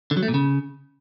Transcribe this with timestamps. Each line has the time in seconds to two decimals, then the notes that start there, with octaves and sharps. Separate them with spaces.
0.11 D3
0.17 F#3
0.23 A3
0.28 A#2
0.34 C#3